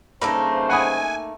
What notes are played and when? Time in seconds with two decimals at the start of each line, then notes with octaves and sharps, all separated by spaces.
0.22 G2 C#3 A3 A#3 D#4 C5 B5
0.70 F#5 G#5 B5 D#6